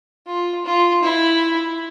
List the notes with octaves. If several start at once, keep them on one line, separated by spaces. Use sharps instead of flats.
F4
F4
E4